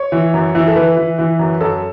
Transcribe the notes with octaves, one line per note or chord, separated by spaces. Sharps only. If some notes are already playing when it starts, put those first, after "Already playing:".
Already playing: C#5
E3
F#2
E3
A4
E3 B4
E3
E3
F#2
F#2 A4